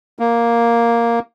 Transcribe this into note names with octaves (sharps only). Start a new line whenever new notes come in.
A#3